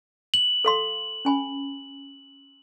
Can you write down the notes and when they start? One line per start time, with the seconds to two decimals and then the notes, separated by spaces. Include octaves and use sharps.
0.34 F#7
0.65 A4 F5 C6
1.25 C#4 G#5 B5